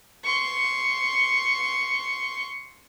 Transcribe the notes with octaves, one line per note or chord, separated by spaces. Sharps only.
C6 C#6